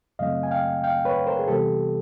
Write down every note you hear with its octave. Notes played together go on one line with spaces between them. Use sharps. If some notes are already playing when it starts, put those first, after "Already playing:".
F#2 C#3 F#3 A3 C4 D#5 F5
G#5
F5 G5
F5 G5
B4 C#5
A#4 C5
G#4
C3 E3 G3 B3 G4 A4